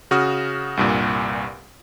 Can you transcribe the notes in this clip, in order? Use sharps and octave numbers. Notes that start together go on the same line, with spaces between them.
C#3 F#4 D#6 F6
C2 G2 A#2